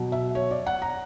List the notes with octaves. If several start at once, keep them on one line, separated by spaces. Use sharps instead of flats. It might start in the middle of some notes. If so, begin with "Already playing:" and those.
Already playing: B2 F#3
E5
C#5
D5
F#5
A#5